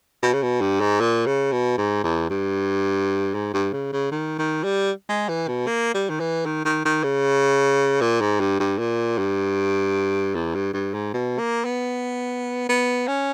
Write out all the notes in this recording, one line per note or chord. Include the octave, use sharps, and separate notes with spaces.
B2
C#3
B2
G2
G#2
A#2
C#3
B2
G#2
E2
G2
G#2
G2
C#3
C#3
D#3
D#3
G3
G#3
E3
B2
A#3
G3
D#3
E3
D#3
D#3
D#3
C#3
A#2
G#2
G2
G2
A#2
G2
E2
G2
G2
G#2
B2
A#3
B3
B3
C#4